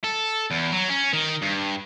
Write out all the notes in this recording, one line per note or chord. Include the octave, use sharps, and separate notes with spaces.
A4
E2
F#3
C#4
D#3
G2